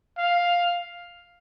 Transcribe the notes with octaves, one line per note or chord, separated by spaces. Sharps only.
F5